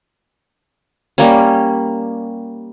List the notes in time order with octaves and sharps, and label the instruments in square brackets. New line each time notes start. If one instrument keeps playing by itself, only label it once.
[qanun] G3 A#3 C#4